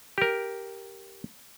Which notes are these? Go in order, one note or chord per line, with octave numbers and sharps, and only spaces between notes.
G4 A#4